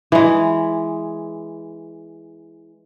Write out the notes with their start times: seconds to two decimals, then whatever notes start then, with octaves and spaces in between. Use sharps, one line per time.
0.12 E3 G#3